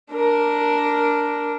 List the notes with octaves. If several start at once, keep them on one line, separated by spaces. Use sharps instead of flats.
D4 A#4